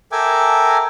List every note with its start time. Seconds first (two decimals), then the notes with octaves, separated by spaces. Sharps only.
0.12 A4 A#4 E5 G5 G#5 D6